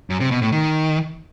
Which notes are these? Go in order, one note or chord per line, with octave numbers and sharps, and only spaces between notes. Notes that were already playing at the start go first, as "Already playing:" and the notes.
F#2
C3
B2
A2
D#3